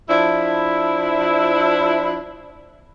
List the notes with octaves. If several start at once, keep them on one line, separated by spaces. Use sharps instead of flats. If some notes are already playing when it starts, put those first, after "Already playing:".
F3 D4 E4